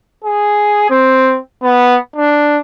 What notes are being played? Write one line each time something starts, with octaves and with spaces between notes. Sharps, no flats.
G#4
C4
B3
D4